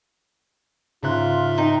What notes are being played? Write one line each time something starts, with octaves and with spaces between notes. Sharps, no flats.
G#2 C#3 F4 E5 A#5 C6 F#6
D#4 G5